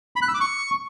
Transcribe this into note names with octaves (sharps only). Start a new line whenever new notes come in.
B5
F#6
E6
D6
C#6